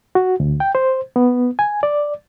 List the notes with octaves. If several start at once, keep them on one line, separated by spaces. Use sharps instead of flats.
F#4
D2
G5
C5
B3
G#5
D5